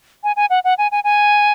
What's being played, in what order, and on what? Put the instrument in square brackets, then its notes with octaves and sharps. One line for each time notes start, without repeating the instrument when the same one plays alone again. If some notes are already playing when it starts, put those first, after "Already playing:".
[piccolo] G#5
G#5
F#5
F#5
G#5
G#5
G#5